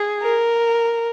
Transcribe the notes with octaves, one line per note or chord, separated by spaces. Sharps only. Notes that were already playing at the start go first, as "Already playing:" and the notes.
Already playing: G#4
A#4